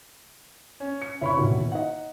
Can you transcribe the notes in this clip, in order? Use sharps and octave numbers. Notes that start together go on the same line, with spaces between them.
C#4
C#7
F1 E4 C#5 B5 C#6
D#1 B2 D#3
D#4 D#5 F#5